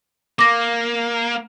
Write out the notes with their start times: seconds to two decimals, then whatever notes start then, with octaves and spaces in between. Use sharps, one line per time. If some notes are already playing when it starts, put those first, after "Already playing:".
0.39 A#3 D6 A#6